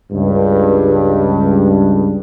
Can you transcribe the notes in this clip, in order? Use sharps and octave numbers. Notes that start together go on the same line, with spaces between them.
C#2 G2